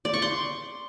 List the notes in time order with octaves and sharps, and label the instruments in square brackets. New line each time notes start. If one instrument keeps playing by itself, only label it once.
[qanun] D5
C#6
C6